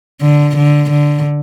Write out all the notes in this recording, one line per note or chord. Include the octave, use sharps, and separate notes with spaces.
D3
D3
D3